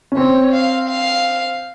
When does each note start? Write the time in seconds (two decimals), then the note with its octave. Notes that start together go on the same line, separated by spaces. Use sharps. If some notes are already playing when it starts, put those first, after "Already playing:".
0.12 C#4
0.17 C4 C#5
0.52 F5
0.89 F5